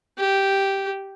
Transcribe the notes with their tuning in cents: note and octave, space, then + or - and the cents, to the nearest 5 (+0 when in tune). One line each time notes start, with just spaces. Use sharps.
G4 -5